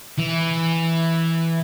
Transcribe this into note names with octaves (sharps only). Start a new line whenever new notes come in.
E3